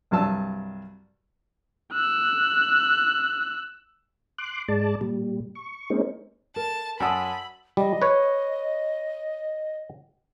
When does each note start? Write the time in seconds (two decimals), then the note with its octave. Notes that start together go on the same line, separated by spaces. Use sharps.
0.11 C2 G2 F#3 A5 E6
1.94 E6 F#6
4.38 C6 D6 F#6
4.68 G#2 G#3 D5 A5
5.01 A#2 G3
5.55 C#6
5.90 G#3 A#3 C4 C#4 D#4
6.56 A#4 A5
7.00 F#2 C#5 F#5 G#5 A5 B5 D#6 E6
7.77 G3 D#5
8.02 B4 C#5